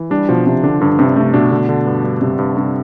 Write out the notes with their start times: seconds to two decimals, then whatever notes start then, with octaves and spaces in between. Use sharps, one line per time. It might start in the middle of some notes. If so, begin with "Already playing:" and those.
Already playing: E3
0.10 G3 D4
0.29 B2 F3
0.46 C3 F3
0.63 D3 D4
0.81 G2 D3
0.99 G2 C3
1.16 C3 A3
1.34 B2 D4
1.51 B2 D3
1.69 D3
1.86 G2
2.04 G2
2.21 G2 C3
2.39 G2
2.57 G2 C3